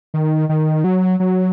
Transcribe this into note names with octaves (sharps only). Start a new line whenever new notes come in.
D#3
D#3
F#3
F#3